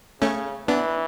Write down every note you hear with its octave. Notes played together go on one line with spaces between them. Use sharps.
C#3 A3 C#4
E3 B3 D4